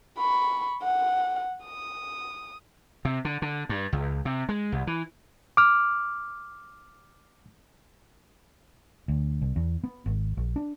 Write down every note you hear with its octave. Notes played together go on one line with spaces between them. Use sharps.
B5 C#6
F#5
D#6
C3
D3
D3
G2
C#2
C3
G#3
C2
E3
D6 F6
D2
C2
E2
B3
G#1
A#1
D4